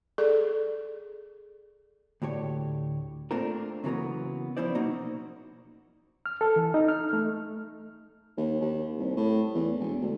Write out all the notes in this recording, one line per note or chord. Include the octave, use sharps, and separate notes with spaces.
G#4 A4 D5
D2 A2 G4 C#5
A3 A#3 C4 D4 F4 A#4
C#3 E3 F#3 A#3 B3
F3 B3 C#4 E4 C5 D5
B2 A#3 D#4 F#4
F6
A4
E3
D#4
F6
A3
D#2
D#2
C2
A2
E2
E1
D2